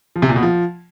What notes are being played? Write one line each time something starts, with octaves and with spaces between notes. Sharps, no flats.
F3
C3
A#2
B2
F3